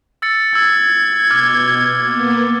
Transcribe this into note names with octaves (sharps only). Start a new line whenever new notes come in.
E6 A6 C#7
E6 G#6 A6
B2 D6 F6
A#3 B3